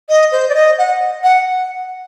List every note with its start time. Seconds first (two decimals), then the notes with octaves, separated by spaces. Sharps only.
0.09 D#5
0.32 C5
0.49 D5
0.54 D#5
0.78 F#5
1.23 F#5